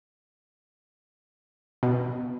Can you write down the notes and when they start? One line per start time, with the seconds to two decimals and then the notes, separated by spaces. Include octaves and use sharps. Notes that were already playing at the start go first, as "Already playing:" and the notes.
1.83 B2